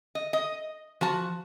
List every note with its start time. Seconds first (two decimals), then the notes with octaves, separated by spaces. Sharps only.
0.15 D#5
0.33 D#5
1.01 F3 F#4 A5